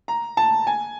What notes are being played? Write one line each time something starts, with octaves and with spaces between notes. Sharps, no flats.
A#5
A5
G#5